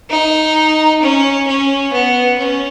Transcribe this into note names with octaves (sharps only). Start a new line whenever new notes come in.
D#4
C#4
C#4
B3
C#4